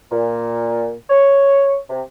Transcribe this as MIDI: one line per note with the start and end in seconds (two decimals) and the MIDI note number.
0.12 0.92 46
1.10 1.77 73
1.90 2.01 48